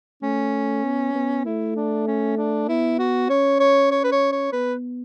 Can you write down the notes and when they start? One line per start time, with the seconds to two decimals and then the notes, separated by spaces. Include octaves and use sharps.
0.22 A3 C#4
0.84 B3
1.15 B3
1.45 A3 E4
1.76 D4
2.07 C#4
2.37 D4
2.68 B3 E4
2.99 F#4
3.30 C#4 C#5
3.60 C#5
3.91 C#5
4.04 B4
4.12 C#5
4.32 C#5
4.52 B3 B4